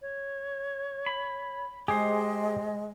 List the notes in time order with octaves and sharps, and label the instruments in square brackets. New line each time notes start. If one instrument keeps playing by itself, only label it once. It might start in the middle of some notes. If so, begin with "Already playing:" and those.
[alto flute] C#5
[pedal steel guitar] B5
[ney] G#3 [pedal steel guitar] G4 C5 [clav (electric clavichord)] G#4 [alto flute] D#5